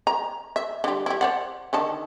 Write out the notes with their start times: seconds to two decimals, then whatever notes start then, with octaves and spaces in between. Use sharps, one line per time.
0.07 A#5
0.56 E5
0.84 D3 G3
1.06 G3 E4
1.21 C5 D5 F#5
1.73 D3 D#3 A5